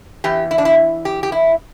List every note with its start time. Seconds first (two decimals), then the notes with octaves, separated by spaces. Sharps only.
0.24 E2 E3 G4
0.51 E4
0.58 D4
0.65 E4
1.05 G4
1.23 G4
1.32 E4